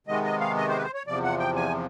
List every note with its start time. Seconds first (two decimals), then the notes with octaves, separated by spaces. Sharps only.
0.07 C3 D#3 G#3 B3 D#5
0.24 D#5
0.40 F5
0.57 D#5
0.69 C5
0.78 B4
0.82 C5
0.94 C#5
1.07 E2 C3 F3 D5
1.24 F#5
1.39 G5
1.56 G#5